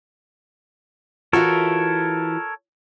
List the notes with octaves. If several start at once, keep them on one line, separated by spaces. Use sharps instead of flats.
E3 F4 F#4 A4 A#4 C#5